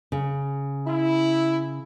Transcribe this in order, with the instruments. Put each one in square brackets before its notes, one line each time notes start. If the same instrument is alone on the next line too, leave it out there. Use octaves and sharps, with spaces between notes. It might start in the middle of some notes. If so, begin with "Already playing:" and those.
[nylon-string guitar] C#3
[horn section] E4